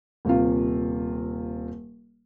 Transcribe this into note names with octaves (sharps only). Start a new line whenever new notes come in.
D#1 C3 F4